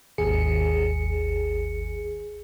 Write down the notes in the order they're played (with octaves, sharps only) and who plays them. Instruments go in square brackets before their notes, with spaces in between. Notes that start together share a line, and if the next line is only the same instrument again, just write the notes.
[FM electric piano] G#1 D#2 G#4 C#7